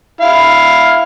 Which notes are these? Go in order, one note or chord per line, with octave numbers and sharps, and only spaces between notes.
E4 F5